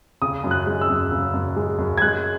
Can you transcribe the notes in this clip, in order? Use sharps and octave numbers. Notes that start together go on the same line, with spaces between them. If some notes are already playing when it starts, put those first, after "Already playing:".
C#3 D#6
F#2
F#6
G#3
E6
F#2
C#3
F#2
G#3
F#2
G#6
G#3 F#6